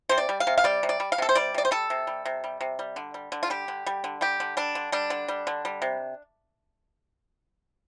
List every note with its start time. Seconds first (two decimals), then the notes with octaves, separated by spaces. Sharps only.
0.09 C3 C5
0.18 D5
0.29 G3
0.40 F5
0.47 C3
0.58 F5
0.64 G3 D5
0.83 C3
0.89 D5
1.00 G3
1.12 F5
1.18 C3 A4
1.29 C5
1.35 G3 D5
1.54 C3 D5
1.65 C5
1.71 G3 A4
1.90 C3
2.07 G3
2.25 C3
2.44 G3
2.61 C3
2.79 G3
2.96 D3
3.14 G3
3.32 D3
3.43 F4
3.50 G3 G4
3.68 D3
3.87 G3
4.04 D3
4.21 G3 G4
4.40 D3
4.57 G3 D4
4.75 D3
4.92 G3 D4
5.10 D3
5.28 G3
5.47 D3
5.65 G3
5.82 C3